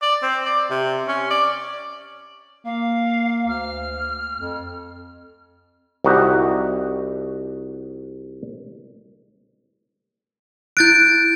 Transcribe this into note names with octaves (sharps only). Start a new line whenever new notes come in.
D5
C4
D5
C3
C#4
D5
A#3 F5
D2 F6
F2
C2 D#4 F#4 G4
E4 F#6 G6 A6 D7